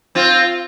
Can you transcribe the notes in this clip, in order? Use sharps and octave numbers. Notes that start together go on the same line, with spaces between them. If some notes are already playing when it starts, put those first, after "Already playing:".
C4 F4